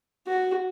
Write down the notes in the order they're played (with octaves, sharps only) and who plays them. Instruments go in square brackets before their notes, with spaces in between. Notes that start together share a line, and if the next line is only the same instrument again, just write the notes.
[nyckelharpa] F#4